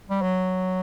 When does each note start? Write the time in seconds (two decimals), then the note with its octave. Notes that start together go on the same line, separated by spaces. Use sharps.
0.09 G3
0.22 F#3